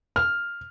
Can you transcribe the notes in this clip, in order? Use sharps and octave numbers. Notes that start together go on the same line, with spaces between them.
F6